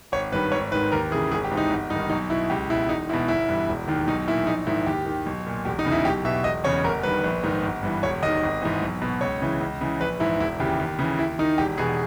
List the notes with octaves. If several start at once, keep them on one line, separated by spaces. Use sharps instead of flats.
G#1 C#5
G2 D#3 B4
G#1 C#5
G#2 D#3 B4
D#2 A#4
C#3 E3 G#4
G#1 G#4
G4
G#2 E3
D#4
G1
G2 D#4
D#3
B1 D#4
B2 E4
C#2 G4
B2 E4
E1 D#4
E2 B2 E4
G1 E4
G2 E3
E1
D#2 D#3
B1 D#4
A#2 E4
A#1 D#4
G#2 D#3 E4
D#2 G4
D#3
B1
A#2
E1 G4
D#4
E2 C#3
E4
B1 G4
B2 E5
E1 D#5
E2 C#3 C#5
G1 A#4
G2 D#3 B4
A#1
G#2 D#3
G1
G2 E3
E1 C#5
D#2 D#3 D#5
G#1
G#2 E3
B1
B2
C#2 C#5
C#3 E3
C#2
C#3 E3
A#1 B4
G#2 E3 E4
E1 E4
D#2 C#3 E3 G4
D#2
C#3 E3
D#2 E4
D#3 D#4
E1 G4
E2 B2 G#4